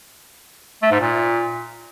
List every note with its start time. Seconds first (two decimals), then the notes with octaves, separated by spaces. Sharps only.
0.82 A3
0.91 G#2
1.00 A#2